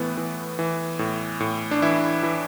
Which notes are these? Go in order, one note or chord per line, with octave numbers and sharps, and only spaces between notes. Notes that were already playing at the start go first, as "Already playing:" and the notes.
Already playing: A2 E3 A3 B3
E3
E3
A2
A2
D4
E3 E4
E3 E4